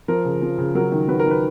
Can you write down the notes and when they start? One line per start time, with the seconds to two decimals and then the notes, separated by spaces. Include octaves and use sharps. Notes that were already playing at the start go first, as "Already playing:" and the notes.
0.08 F3 A#4
0.25 C#3
0.42 F3
0.58 C#3
0.75 F#3 A#4
0.92 D#3
1.08 F#3 B4
1.19 A#4
1.26 D#3
1.31 B4